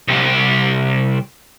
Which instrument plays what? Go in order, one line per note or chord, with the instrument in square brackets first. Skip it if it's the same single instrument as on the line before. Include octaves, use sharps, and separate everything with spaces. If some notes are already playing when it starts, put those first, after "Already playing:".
[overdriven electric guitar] C2 G4